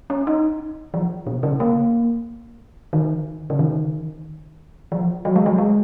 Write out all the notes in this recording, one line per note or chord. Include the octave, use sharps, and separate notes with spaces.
C#4
D#4
F3
B2
C#3
A#3
D#3
C#3
D#3
F3
F#3
G#3
F#3
G#3